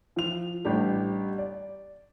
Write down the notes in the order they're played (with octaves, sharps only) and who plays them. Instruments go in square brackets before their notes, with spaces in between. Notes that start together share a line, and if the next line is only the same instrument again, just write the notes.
[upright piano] F3 F7
A1 G3 D4 G4
D5